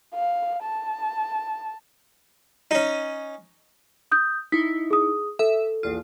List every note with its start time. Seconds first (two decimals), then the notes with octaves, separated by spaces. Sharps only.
0.15 F5
0.63 A5
2.71 C#4 D#4
4.12 D#6 G6
4.52 D#4 E4 B6
4.90 G#4 D#6
5.39 A4 E5
5.83 A#1 E2 F4